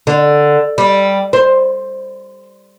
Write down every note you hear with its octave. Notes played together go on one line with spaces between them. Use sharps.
D3
G3
C5